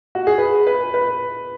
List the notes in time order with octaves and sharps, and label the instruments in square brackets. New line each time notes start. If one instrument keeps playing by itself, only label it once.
[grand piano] F#4
G#4
B4
B4
B4